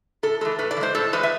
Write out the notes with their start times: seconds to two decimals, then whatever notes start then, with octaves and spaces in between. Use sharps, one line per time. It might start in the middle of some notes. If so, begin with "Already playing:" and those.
0.23 A2 A4
0.41 E3 G#3 A4
0.59 A2 B4
0.71 D5
0.77 E3
0.81 G#3 C5
0.95 A2 A4
1.13 E3 G#3 B4
1.23 E5